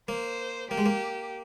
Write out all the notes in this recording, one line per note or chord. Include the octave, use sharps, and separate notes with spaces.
A#3 C5
A#3 G4
G#3
A#3